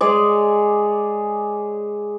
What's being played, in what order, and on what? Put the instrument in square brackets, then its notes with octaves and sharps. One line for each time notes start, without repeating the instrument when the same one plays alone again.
[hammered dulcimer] G#3 G#4 C#5 D5